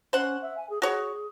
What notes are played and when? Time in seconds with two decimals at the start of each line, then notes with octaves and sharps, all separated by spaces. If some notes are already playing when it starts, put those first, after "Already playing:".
0.13 C#4 C5 F#5
0.41 E5
0.57 G#5
0.69 G#4
0.82 F#4 G#4 C#5